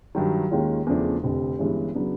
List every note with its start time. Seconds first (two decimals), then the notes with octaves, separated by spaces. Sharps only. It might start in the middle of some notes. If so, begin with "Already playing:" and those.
0.15 G2 D#3 F#3
0.50 D#2 D#3 G#3 C#4 F4
0.86 E2 C#3 F3 A3 D4
1.23 F1 F2 D3
1.59 G1 G2 E3 G#3 C#4
1.95 C#3 F#3 B3 D4